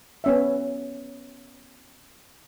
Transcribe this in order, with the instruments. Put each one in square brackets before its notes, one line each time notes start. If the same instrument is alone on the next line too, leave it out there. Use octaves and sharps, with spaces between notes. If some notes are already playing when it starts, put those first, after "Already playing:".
[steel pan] B3 C#4 E5